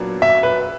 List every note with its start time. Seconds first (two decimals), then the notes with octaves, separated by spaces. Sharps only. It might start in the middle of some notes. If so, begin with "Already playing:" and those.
Already playing: A#2 F#3 B3 D4
0.22 E5
0.43 B4